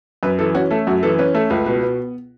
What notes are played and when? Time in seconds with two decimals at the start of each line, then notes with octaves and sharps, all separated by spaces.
0.23 F#2 B4
0.39 E3 A4
0.55 C#4 F#4
0.71 A3 A4
0.87 F#2 F#4
1.03 E3 A4
1.18 C#4 B4
1.34 A3 A4
1.50 C#2 B4
1.66 B2 B4
1.83 B3